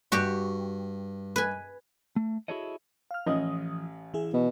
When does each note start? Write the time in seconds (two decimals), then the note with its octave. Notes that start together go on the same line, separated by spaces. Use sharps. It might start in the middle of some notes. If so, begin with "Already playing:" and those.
0.12 G2 F#4 G4
1.36 B4 G#5
2.16 A3
2.48 E4 F#4 G#4 A4 C#5 D#5
3.11 F5 F6
3.27 A1 E3 F3 D#5 D#6
4.14 E3 E4 G#4
4.33 B2